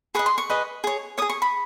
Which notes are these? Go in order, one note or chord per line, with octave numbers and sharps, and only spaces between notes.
G#4 B4 D#5 C#6
C6
C#6
G#4 B4 D#5
G#4 C#5
C#5 D#6
G#4
C#6
B5